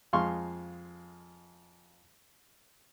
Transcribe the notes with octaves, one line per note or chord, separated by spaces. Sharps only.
F2 G#3 F5 C6 C#6